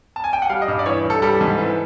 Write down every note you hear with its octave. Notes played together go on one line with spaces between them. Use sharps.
A5
G#5
G5
F#5
G3 F5
D#5
G2
D5
E3 C#5
G2
A4
G3 A4
G#2
E3